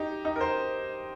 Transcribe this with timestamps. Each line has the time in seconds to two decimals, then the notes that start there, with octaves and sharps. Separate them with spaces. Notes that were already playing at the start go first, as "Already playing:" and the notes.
Already playing: D#4 G4
0.25 D#4
0.36 A#4
0.41 C5